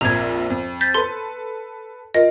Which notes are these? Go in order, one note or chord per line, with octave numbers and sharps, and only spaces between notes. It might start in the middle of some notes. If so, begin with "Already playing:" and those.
A#1 F2 A#2 A#5 G#6
F2
G6 A6 B6
A4 B4 C6
F4 A#4 D#5